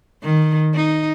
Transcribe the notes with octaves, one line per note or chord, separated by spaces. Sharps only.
D#3
D#4